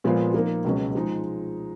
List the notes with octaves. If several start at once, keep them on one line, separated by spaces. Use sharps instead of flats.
A#2 F3 G#3 B3 F4
F3 A#3 D#4
C#2 B2 F#3 C#4
F3 G#3 D#4